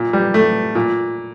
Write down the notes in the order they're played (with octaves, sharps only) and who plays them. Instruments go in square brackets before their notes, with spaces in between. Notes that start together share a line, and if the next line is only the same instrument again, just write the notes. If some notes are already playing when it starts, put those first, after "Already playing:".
Already playing: [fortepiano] A#2
G3
A3
A#2